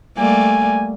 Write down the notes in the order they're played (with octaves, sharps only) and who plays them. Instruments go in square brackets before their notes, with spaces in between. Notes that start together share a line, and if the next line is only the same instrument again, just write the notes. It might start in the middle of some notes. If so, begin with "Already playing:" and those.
[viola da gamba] G3 A3 A#3 [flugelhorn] G#5